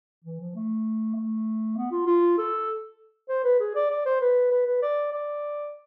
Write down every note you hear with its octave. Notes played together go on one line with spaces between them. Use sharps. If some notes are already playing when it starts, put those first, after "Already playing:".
E3
F3
A3
A3
B3
F4
F4
A4
C5
B4
G#4
D5
D5
C5
B4
B4
B4
D5
D5